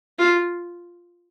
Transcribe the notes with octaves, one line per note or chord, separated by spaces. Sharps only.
F4